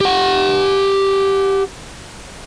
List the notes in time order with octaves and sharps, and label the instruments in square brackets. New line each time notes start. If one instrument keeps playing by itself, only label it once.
[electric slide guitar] G4 F#5